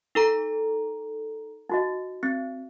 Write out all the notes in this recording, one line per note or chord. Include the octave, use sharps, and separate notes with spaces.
D#4 A4 A#5
D#4 F#4 D#5
C4